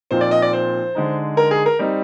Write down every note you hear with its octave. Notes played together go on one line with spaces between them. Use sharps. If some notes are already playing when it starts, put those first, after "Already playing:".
A#2 F3 C4 D#4 C5
D5
D#5
D5
C5
D3 G#3 D#4
A#4
G#4
A#4
G3 C4 D#4